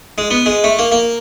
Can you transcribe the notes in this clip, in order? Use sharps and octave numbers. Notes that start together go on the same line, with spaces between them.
G#3
B3
G#3
A3
A#3
A#3